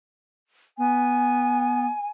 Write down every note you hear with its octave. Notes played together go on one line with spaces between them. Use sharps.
B3 G#5